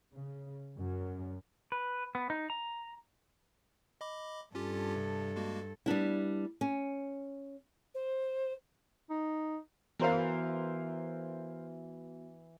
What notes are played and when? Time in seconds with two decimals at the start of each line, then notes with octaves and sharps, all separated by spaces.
0.14 C#3
0.78 F#2
1.72 B4
2.15 B3
2.30 D#4
2.50 A#5
4.01 D#5 B5 D6
4.55 G2 C#4 F4 G4 A4
4.96 C3
5.36 G#3 A#3 F#4
5.86 G3 B3 D4 E4
6.61 C#4
7.95 C5
9.10 D#4
9.99 E3 B3 F#4 A#4 C5 F5